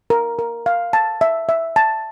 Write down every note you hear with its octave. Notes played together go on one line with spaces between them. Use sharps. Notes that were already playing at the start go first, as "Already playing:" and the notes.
A#4
A#4
F5
A5
E5
E5
A5